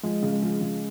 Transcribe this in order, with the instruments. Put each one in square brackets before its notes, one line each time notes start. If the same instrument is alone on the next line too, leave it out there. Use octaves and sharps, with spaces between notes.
[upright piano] F3 [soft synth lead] G#3
[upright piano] C#3
[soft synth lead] G#3
[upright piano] F3
C#3